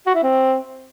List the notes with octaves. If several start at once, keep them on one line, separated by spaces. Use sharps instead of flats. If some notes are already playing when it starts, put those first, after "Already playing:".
F#4
E4
C4